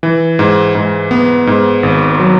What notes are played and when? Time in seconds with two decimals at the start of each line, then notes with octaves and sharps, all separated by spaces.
0.03 E3
0.39 G#2
0.75 G#2
1.11 B3
1.47 G#2
1.83 G#1
2.20 F#3